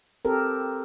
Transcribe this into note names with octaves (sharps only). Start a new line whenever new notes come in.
C4 G4 A4 A#4